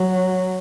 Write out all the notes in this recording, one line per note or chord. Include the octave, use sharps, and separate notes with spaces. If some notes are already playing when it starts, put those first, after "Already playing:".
Already playing: F#3